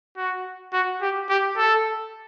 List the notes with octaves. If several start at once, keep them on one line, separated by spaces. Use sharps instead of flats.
F#4
F#4
G4
G4
A4